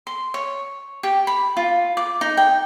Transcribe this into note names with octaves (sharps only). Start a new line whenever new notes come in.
C6
C#5
G4
B5
F4
D6
D#4
G5